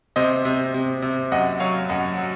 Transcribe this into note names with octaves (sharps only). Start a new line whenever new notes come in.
C3 C5 D#5
C3
C3
C3
F#2 D#5 F#5
F#3 C#5 F5
F#2 D#5 F#5
F#3